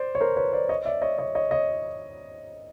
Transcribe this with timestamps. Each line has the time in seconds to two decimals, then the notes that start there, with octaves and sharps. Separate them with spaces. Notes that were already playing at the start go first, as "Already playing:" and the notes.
Already playing: C5 D5
0.15 C#5
0.21 A#4 C5
0.36 B4 C#5
0.53 C5 D5
0.69 C#5 D#5
0.85 D5 E5
1.02 C#5 D#5
1.18 C#5 D#5
1.35 C#5 D#5
1.51 C#5 D#5